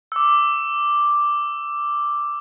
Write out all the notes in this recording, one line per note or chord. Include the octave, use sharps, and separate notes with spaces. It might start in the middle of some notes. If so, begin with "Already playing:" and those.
D6 E6